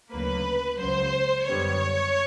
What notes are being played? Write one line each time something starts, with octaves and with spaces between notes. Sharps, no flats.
D2 C#3 F#3 A#3 B4
C#2 C#3 F#3 C5
F#2 D3 G3 B3 C#5